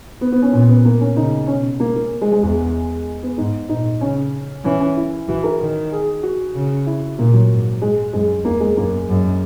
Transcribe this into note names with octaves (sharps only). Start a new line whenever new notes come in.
B3
B3
C#4
A#2 C#4
B3
A#3
C#4
C#3 D#4
B2 C#4
A#3
A#3
G#3
G#3
E2 G#3
B3
G#2 D#4
A#2 D#4
C#3 C#4
E3 C#4
C#4
E4
E3 F#4
A#4
D#3
G#4
F#4
C#3
E4
A#2 A#3
F#3
G#2
G#3
F#2 G#3
E2 A#3
G#3
F#2 A#3
F#2